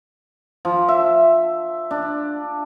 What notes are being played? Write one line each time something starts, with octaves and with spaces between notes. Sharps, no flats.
F3
E5
D4